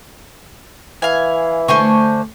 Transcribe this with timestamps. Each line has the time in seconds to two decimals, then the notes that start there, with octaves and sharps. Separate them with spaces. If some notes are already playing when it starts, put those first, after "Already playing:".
1.02 E3 F5 G#5
1.68 D3 A3 C5 G#5 C#6